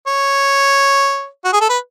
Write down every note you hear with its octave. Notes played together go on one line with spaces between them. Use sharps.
C#5
F#4
G#4
A4
B4